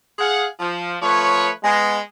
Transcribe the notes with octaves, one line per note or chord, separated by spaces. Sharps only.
G#4 F5 F#5
F3
F3 A3 B4 C#5
G#3 B3